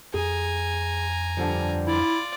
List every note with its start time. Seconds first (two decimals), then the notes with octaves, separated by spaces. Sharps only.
0.14 F2 G#4 G#5 A#5
1.37 G2 D3 F3
1.87 E4 F4 D5